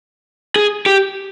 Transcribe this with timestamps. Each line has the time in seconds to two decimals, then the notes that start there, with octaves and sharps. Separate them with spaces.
0.56 G#4
0.86 G4